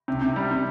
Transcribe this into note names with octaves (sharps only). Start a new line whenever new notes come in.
C3
C3
G3
C3